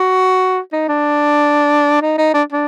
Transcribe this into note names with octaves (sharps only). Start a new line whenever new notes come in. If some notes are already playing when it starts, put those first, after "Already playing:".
Already playing: F#4
D#4
D4
D#4
D#4
D4
D4